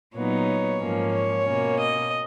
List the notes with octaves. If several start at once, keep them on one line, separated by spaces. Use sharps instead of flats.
A#2 F#3 B3 D#4 C#5
G#2 F3 A#3 C#4
C#5
B2 A#3 C#4
D#5